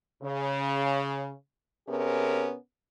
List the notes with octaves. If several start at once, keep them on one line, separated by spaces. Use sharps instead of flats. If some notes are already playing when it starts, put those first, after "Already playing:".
C#3
C3 B3 C#4 G#4 A#4